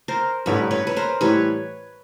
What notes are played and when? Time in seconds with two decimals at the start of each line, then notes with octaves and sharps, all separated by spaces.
0.08 A#4 C5
0.46 A1 G2 D3 B4 C#5
0.71 B4 C#5
0.87 B4
0.96 A#4 C5
1.21 A2 E3 G3 B4 C#5